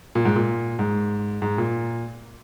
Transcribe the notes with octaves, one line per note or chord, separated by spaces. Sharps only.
A#2
G#2
A#2
G#2
G#2
A#2